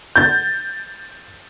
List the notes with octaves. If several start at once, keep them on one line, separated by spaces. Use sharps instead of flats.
G6 A6